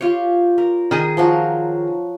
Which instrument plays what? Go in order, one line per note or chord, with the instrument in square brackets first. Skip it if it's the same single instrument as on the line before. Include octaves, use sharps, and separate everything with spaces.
[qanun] F4 G4 C#5
A#4
[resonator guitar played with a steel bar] D#3 G#4
[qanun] F3 F#3 F#4